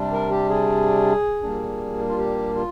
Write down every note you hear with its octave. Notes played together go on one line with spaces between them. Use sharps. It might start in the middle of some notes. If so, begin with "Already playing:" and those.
Already playing: C3 G3 D4
A#4
G4
G#4
A#2 G3 A#3 D4
F4
G4
F4